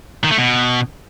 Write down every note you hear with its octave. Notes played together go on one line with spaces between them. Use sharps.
D#3
A3
B2